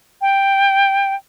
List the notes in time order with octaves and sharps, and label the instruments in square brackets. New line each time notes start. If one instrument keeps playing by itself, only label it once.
[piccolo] G5